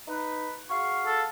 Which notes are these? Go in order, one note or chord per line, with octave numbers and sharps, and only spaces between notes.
D#4 B4
F#4 G#4 F5 C#6
A4